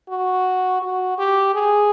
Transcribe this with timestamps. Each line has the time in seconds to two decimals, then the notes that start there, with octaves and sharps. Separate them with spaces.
0.09 F#4
0.82 F#4
1.18 G4
1.54 G#4